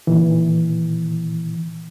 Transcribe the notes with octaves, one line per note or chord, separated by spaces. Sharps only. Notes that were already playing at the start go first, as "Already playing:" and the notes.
A#2 D#3 E3